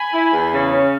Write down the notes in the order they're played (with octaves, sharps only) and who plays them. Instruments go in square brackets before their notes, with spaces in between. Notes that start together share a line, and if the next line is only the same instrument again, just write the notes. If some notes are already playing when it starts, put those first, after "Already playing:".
Already playing: [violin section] G#5 B5
[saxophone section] E4
E2
C#3
C#4